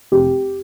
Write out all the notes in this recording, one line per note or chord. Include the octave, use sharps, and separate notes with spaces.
F1 G4